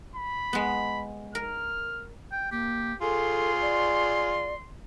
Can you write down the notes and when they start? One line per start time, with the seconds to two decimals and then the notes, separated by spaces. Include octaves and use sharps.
0.15 B5
0.53 G#3 B3
1.35 A#4 F6
2.32 G5
2.52 A#3 G4
3.02 F4 G#4 A4 C6
3.61 D5